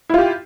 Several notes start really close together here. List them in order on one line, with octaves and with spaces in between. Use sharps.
E4 F4 G4